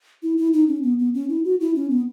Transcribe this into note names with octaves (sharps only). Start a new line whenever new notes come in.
E4
E4
D#4
C#4
B3
B3
C#4
E4
F#4
E4
C#4
B3